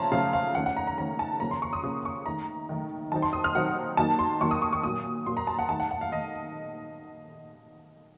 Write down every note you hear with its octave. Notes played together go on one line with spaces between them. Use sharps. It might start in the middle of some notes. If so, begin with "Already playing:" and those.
Already playing: C#3 F3 A3 C#4 A5 A#5 C6
C#3 F3 A3 C#4 F4 F5
F5
D#3 A3 C#4 F#5
F#5
A#5
A#5
D#3 A3 C#4 A#5
A5
C#3 F3 A#3 C#4 A#5
C6
C#6
D#6
C#3 F3 A#3 C#4 D#6
C#6
D#3 A3 D#4 A#5
D#3 A3 D#4
D#3 F#3 C4 D#4 A5
C6
D#6
F6
D#3 F#3 C4 D#4 F#5
D#3 F#3 A#3 D#4 A5
C6
D#3 F#3 A#3 D#4 C#6
D#6
C#6
C#6
A#2 F#3 A#3 D#6
A#2 F#3 A#3 C6
A#5
A5
F#5
D#3 A3 D#4 A5
F#5
F#5
F5
D#3 A3 D#4 D#5